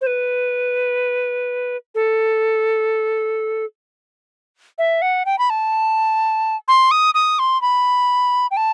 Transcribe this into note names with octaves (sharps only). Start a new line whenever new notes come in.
C5
B4
A4
E5
F#5
G5
B5
A5
C6
D#6
D#6
C6
B5
G5
A5